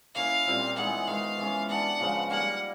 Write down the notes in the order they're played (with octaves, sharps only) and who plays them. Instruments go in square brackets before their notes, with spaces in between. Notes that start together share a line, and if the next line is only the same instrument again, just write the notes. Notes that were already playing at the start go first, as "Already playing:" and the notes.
[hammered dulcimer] A#3 C#4 E4 [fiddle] F5
[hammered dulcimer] A#2 G3 C4 F4
[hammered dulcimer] E3 G#3 B3 D#4 [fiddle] F#5
[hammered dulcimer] D#3 G#3 B3 D#4 [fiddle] F5
[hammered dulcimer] E3 G#3 C#4
[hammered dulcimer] B3 D4 G4 [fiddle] F#5
[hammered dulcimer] C#3 F3 G#3 B3
[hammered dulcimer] G3 A#3 D#4 [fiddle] F#5